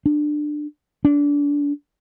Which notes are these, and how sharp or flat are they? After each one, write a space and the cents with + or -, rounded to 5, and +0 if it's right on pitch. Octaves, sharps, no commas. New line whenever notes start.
D4 +20
D4 -25